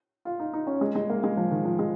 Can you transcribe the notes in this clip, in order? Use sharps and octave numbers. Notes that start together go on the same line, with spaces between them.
F4
D#4
D#4
C#4
G#3
G#3
A#3
G#3
F3
D#3
F3
G#3